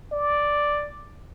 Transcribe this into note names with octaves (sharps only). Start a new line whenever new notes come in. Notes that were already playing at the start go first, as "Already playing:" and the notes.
D5